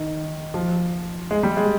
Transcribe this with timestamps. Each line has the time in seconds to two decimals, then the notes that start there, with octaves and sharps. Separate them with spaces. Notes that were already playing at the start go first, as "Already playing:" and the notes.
Already playing: D#3
0.54 F3
1.31 G#3
1.43 G3
1.57 G#3